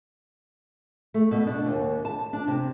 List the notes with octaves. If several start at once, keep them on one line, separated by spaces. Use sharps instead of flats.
A3
B2
D4
D#2
A5
D4
C3